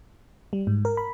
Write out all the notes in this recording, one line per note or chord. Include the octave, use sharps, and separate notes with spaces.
G3
G#2
A#4
B5